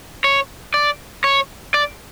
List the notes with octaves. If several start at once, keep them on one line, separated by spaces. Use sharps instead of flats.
C#5
D5
C#5
D5